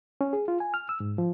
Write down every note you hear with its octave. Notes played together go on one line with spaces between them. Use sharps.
C#4
G#4
F4
G#5
F6
E6
G#2
F3